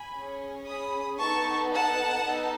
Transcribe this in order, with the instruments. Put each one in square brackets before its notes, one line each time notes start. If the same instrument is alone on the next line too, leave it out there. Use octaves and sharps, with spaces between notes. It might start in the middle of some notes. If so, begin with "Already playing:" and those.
Already playing: [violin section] G#5 B5
C#4 G#4
B5 D#6
B3 D#4 A4 A5 C#6
F#5 A5
B3 D#4 A4